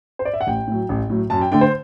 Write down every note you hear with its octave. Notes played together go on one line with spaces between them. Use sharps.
C5
D5
E5
F#5
A1 G5
A2 F#3
A1
A2 F#3
F#2 A5
G5
D3 A3 D4 G5
C5